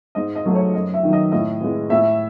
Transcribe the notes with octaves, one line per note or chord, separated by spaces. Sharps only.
G#2 D#5
D#5
F#3 A3
C#5
F#2 D#5
E5
D#3 F#3
D#5
A2 D#5
E3 G#3
A2 E5